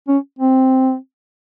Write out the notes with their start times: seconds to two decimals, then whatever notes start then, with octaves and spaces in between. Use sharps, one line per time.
0.08 C#4
0.39 C4